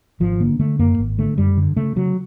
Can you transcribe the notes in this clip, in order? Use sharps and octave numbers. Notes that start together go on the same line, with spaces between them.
G#1 F3
D3 A#3
D3 A3
F#2 A#3
G#1
D3 A3
F#2 G3
D3
C#3 A3
C#3 F#3